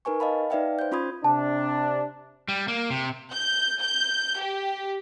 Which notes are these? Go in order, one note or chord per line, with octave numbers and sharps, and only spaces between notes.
D#4 A#4 B4 G#5 C#6
D#5 F5 A5 B5
D#4 B4 D5 E5 F5 G5
C5 G6
C#4 F4 B5 C6 D#6 G#6
C3 D4 A5
G3
A#3
C3
G6
G6
G4